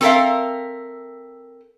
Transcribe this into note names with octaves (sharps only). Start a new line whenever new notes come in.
C4 A4 A#4 C#5 E5 F5